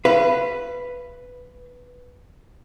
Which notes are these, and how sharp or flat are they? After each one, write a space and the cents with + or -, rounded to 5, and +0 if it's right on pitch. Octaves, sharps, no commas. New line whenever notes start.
B4 +0 F5 -40